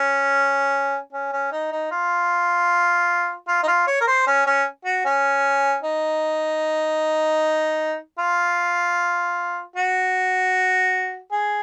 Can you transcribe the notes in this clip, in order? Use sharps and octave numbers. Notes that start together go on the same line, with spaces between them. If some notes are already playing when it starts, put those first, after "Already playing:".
Already playing: C#4
C#4
C#4
D#4
D#4
F4
F4
D#4
F4
C#5
A#4
C5
C#4
C#4
F#4
C#4
D#4
F4
F#4
G#4